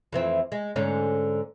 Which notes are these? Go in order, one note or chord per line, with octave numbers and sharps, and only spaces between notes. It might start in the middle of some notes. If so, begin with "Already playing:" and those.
F2 E3 C4
G#3
G#2 D3 C#4